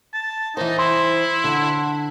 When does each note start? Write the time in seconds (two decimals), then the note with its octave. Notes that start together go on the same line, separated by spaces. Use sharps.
0.14 A5
0.57 E3 D#4 C5
0.79 E4 C6
1.44 D3